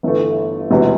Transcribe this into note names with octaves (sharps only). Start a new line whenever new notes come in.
G1 G2 E3 A3
E1 D2 C3 E3